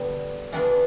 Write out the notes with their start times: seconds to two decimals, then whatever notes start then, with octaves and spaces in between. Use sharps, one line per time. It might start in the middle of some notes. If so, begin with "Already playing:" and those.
Already playing: D3 G3 B3
0.52 E3 G3 B3 D4 F4